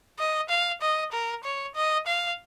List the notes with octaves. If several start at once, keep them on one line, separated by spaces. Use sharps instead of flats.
D#5
F5
D#5
A#4
C#5
D#5
F5